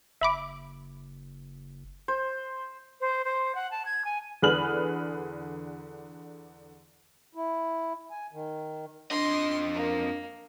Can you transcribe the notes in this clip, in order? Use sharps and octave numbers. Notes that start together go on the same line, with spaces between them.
F#1 E5 B5 D6
C5
C5
C5
F#5
A5
G#6
G#5
E2 D3 G#4 B4 F6 F#7
E4
G#5
D#3
F2 D4 D#5 C6
A#3